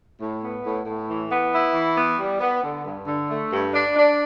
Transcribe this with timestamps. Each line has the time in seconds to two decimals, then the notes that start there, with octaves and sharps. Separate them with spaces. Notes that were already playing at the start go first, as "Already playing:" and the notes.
0.20 A2
0.42 B3
0.64 A2
0.86 A2
1.08 E3
1.30 B3
1.53 E4
1.74 E3
1.97 B3
2.19 G3
2.41 B3
2.63 D3
2.86 G2
3.07 D3
3.29 A3
3.52 G2
3.73 D4
3.96 D4